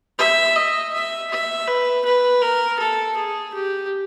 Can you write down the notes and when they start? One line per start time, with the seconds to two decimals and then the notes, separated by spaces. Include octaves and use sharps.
0.19 E5
0.56 D#5
0.93 E5
1.31 E5
1.68 B4
2.05 B4
2.42 A#4
2.79 A4
3.16 G#4
3.54 G4